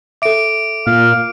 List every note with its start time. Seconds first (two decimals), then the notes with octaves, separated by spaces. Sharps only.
0.22 A4 E5 D6 D7
0.87 A#2 F5